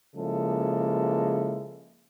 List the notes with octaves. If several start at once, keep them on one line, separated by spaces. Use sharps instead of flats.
C#3 F3 G#3 A#3 E4 A4